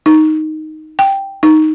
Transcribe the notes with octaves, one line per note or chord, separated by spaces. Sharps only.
D#4
G5
D#4